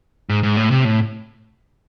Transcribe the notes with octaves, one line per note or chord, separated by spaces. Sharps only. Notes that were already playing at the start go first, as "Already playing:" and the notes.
G#2
G#2
A2
C3
A2